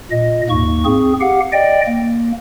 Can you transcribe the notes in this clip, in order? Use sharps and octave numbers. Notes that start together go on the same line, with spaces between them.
A#2 D#5
D#2 G#2 A#3 C#6
C4 G#4
G4 F5 F#5
D5 D#5 G5
A#3